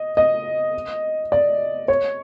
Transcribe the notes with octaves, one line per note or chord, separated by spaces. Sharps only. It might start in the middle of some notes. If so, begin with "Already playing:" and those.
Already playing: D#5
D#5
D5
C#5